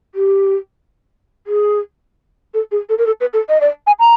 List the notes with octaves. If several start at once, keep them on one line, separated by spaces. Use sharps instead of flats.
G4
G#4
A4
G#4
A4
A#4
A4
B4
A4
D#5
D5
G#5
A#5